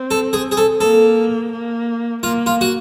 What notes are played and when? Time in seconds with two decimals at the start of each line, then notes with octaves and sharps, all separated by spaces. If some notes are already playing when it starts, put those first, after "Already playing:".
Already playing: C4
0.11 A4
0.33 G#4
0.52 G#4
0.57 A4
0.81 A#3 A4
1.53 A#3
2.23 A#3 F4
2.46 F4
2.61 F#4